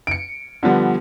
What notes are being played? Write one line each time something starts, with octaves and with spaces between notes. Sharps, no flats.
C#7 D7
D3 F3 G3 B3